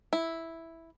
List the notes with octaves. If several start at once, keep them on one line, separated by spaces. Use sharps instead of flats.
E4